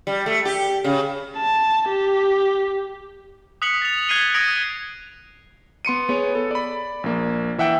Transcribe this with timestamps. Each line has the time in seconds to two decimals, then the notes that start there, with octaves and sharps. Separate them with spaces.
0.07 G3
0.26 A3
0.45 G4
0.84 C#3
1.37 A5
1.89 G4
3.62 D#6 F#6 B6 C#7 F#7
3.82 A6 F7
4.09 F#6 G#6 B6 C7 D#7 G7
4.34 D#6 G#6 A#6 C7 D7 F#7
5.85 B3 C6 C#7 D#7
6.09 B3 G#4 C#5
6.35 A4
6.51 D5 B5
7.04 A#1 A#3
7.58 E3 E5 F#5 G5 E6